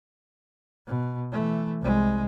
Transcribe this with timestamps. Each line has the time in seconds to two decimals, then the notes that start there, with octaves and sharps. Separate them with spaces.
0.87 B2
1.32 E3 A3
1.81 C2 G#3